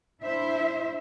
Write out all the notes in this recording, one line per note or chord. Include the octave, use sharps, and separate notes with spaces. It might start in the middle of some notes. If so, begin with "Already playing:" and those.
D4 E4 C5 E5